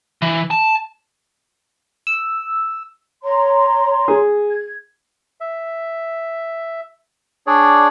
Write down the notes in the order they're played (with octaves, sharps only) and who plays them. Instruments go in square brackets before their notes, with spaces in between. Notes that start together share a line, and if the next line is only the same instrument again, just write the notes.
[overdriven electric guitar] E3
A5
[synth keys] E6
[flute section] C#5 A#5 C6
[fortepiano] G#4
[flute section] G#6
[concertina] E5
D4 G#4 C#5 D5